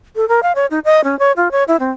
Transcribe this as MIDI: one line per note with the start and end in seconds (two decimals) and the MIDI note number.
0.16 0.28 69
0.28 0.40 70
0.43 0.52 77
0.55 0.66 73
0.71 0.79 63
0.85 1.03 75
1.04 1.18 61
1.19 1.32 73
1.37 1.51 65
1.52 1.64 73
1.68 1.77 64
1.80 1.91 60